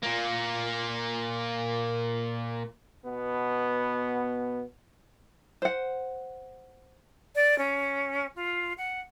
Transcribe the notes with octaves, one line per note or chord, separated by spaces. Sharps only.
A#2 A#3
B2 B3
C5 F#5
D5
C#4
F4
F#5